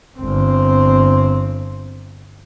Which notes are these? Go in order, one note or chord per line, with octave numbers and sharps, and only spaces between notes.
G1 C4